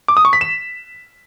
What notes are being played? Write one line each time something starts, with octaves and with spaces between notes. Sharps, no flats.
D6
D#6
C#6
B6
E7